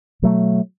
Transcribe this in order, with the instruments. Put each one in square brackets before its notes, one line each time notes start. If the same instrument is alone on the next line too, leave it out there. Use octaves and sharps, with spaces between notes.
[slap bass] B2 F#3 A3